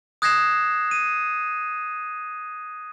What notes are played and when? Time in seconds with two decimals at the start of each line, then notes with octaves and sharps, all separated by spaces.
0.22 D#6 F#6 G#6 A#6 C7 E7
0.91 D#7